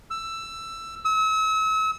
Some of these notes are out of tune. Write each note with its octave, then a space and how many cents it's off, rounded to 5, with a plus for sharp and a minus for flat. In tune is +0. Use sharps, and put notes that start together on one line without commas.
E6 +10
E6 -40